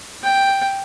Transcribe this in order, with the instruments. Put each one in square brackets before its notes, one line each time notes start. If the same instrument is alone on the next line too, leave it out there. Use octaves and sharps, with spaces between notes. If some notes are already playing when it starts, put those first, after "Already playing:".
[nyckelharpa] G5